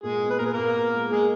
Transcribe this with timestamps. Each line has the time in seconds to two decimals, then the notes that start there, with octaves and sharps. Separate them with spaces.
0.03 A#2 G#3 G#4
0.22 B3
0.30 B4
0.39 A#2 A#4
0.46 G#4
0.54 A#2 A#3 A#4
0.76 B3
0.93 G#3
1.11 G#3 A#3 G#4